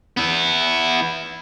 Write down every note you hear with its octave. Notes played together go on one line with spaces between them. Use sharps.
B3 E4